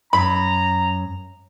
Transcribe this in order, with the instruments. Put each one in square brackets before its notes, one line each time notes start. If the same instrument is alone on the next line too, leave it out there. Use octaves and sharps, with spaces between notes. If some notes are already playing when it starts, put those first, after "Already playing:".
[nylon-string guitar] F#2 [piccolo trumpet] A#5 [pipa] B5